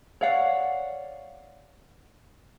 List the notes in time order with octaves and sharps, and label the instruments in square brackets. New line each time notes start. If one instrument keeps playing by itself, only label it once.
[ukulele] C#5 D5 F5 F#5